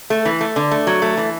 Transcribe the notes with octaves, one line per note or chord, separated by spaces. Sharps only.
A3
E3
A3
D3
A3
F#3
A3
E3